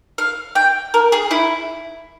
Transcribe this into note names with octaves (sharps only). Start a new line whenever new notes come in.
F5
G5
A#4
G#4
E4